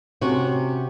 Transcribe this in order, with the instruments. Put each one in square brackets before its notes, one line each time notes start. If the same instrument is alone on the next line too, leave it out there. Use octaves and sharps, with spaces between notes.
[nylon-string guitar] C3 C#4 F#4